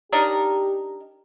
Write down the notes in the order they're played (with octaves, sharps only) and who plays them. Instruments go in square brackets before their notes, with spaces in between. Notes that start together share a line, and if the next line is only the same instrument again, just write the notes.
[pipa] D4 D#4 A#4 [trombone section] G4